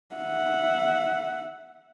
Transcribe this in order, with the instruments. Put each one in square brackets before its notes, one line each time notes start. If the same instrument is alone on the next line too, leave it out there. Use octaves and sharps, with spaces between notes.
[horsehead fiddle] E5 F#5